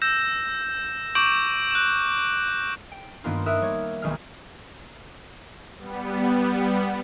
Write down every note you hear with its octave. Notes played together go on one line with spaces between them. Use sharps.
E6 G6 A#6 E7
C#6 D6 G6 D7 E7 F#7
F#6 E7
G5
G2 D#3 A#3 B3 D#4 F4
A#4 E5 D#6 F#6
G3 C#5
B1 D#3 G#3 F6
G3 B3